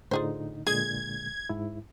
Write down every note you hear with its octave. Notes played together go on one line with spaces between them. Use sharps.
A2 D3 D#4 F4 G#4 C5
A#2 D3 G#3 G#4 G#6
G#2 E4